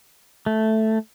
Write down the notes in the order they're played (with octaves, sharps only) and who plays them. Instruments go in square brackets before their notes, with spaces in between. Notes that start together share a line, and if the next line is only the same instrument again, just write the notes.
[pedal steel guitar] A3